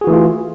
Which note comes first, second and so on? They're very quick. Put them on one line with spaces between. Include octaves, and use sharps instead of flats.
G#4 F#4 E3 A3 F4